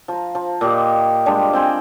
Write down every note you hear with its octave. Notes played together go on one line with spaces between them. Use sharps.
F3 A#5
F3
A#2 G4 D#5
G3 G#3 D4 F4
C4 G5 G#5